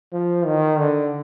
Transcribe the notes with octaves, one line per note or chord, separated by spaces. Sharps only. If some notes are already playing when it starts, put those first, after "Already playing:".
F3
D#3
D3